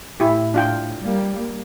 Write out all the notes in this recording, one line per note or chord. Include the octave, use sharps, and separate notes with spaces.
A2 E4 G4
D4 F4 G5
G3 A#3